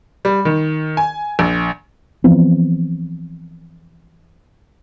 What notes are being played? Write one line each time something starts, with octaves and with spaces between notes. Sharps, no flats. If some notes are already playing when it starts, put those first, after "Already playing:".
G3
D#3
G#5
A#1
E3 F3 B3 C4